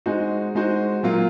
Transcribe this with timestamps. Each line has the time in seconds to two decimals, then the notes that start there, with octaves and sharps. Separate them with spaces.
0.06 G#3 D#4 F#4 C5
0.55 G#3 D#4 F#4 C5
1.03 A#2 F#3 A#3 F4